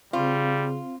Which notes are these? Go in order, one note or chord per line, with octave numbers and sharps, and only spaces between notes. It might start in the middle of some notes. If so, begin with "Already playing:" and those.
C#3 G3 C4 F4